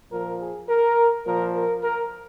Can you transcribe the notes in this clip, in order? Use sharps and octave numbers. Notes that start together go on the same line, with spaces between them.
A#2 F3 A#4
G#4
A#4
A#2 F3 A#4
A#4
A#4